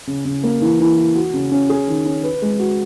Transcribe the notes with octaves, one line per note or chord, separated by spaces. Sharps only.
C#3
C#3
A#3
E3
E3
E4
F#4
C#3
C#4
G#4
D#3
C#4
B4
G#3
F#4